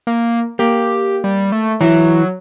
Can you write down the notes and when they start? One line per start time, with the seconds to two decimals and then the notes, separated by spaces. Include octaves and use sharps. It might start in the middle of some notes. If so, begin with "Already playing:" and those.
0.07 A#3
0.59 A#3 G4
1.24 G3
1.52 A3
1.81 E3 F#3 E4